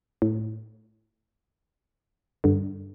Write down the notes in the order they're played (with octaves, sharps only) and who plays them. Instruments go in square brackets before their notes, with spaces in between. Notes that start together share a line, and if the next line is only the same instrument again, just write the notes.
[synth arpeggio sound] A2
G2 D3